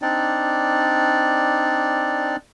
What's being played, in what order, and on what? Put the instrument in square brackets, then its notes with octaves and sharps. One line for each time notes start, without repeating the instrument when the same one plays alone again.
[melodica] C4 D4 D#4 D5